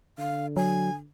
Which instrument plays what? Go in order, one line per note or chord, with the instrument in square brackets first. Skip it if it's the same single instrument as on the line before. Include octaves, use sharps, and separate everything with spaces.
[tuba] D3 [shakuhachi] F5
[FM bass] F#3 [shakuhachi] G#5